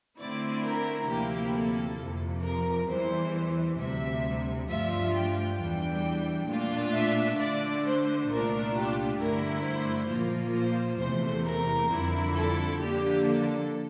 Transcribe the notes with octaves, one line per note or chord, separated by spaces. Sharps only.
D3 A3 C4 E4 D5
A#4
D2 C3 F3 A#3 E4 G4
A4
F2 C3 F3
A#4
E2 E3 G3 C5
D2 C3 G3 E5
G2 F3 A3 D4 F4 E5
G5
E2 E3 G3 D4 G5
A#2 A3 D4 F4
E5
D3 A3 D4 D5
C5
C2 A#2 A3 D4 F4 A#4
G4
G2 D3 A3 E4 A#4
C5
A#2 F3 A#3 F4
C5
E2 C3 E3 A3 C5
A#4
F2 D3 G3 C4 E4
A4
D3 F3 A#3 D4 G4
A4